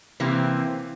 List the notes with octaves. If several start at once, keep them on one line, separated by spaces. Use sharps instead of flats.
C3 E3 A#3 C4